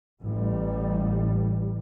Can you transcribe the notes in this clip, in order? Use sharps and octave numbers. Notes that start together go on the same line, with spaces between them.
A1 G3